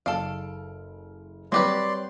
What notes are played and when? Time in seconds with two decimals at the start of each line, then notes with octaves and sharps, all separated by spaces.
0.06 F#1 A4 F5 F6 D7
1.52 F#3 G3 C4 G4 B4 D5 C6